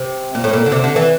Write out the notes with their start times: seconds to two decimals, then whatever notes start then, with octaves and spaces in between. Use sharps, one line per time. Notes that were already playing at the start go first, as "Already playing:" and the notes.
Already playing: C3
0.35 A#2
0.44 A2
0.53 A#2
0.66 D3
0.72 C3
0.84 D3
0.96 E3